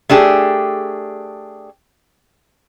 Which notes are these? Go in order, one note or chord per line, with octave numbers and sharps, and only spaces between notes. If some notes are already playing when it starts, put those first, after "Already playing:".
A3 D4 G4 G#4